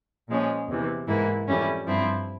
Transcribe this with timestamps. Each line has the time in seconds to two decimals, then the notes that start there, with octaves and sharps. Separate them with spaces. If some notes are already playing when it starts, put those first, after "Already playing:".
0.28 A#2 F3 G#3 C#4
0.68 E2 C3 E3
1.07 G#2 E3 A#3 E4
1.47 F2 E3 G3 C#4 E4
1.86 G2 F3 C4 E4